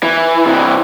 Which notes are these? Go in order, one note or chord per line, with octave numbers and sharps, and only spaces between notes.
E3
C3 E3